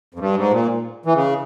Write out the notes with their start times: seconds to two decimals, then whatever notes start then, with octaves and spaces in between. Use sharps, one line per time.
0.14 F2
0.19 G2
0.35 G#2
0.51 A#2
1.06 E3
1.14 C#3